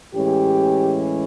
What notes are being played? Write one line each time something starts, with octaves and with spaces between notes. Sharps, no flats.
A2 E3 G#3 C#4 G4